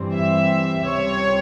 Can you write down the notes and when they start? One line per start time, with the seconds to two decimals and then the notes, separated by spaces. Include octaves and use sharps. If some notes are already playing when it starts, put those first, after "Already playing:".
Already playing: G2 E3 G3 C4
0.12 E5
0.85 C#2 C3 G3 C4 C#5